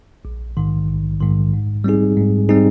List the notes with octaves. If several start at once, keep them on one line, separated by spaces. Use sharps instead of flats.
A#1
G#2 D#3
A#1
G#2 D#3
G#2
G3 C4 D#4 G#4
G#2
G3 C4 D#4 G#4